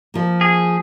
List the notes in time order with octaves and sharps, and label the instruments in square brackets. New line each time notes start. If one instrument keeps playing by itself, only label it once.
[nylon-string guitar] F3 A#3
[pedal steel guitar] G#4